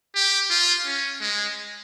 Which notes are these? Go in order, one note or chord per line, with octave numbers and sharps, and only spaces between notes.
G4
F4
C#4
G#3